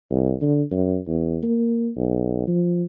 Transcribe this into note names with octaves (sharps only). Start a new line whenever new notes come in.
C2
D3
F#2
E2
A#3
B1
F3